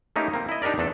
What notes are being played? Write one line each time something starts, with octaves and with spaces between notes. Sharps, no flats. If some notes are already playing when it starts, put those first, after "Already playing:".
A3 A#3 C#4 D#4 E4 G4
A#3 C4
E4 D#5
D4 D#4 G4 A#4 D5
E2 A3 D4 A4